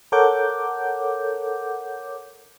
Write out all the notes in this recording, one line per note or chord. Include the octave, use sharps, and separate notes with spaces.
A4 A#4 C#5 F#5 D6 G6